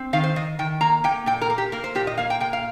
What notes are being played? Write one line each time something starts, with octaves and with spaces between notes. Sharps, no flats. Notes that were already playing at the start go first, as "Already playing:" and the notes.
Already playing: C4
D#3 F5
C5
D#3 D#5
D#3 G5
A#3 A#5
A#3 G5
A#2 G5
A#4
A#3
G4
A#3 A#4
C5
A#2 G4
D#5
A#3 F5
G5
A#2 G5
F5